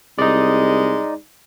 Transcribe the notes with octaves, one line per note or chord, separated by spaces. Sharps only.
C2 G#3 D#4 D5